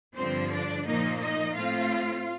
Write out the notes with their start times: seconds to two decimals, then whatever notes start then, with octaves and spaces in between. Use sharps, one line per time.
0.16 G2 D3 F3 C4 C5
0.52 D4 D5
0.87 A#2 F3 A#3 D#4 D#5
1.21 D#4 D#5
1.56 A2 A3 C4 F4 F5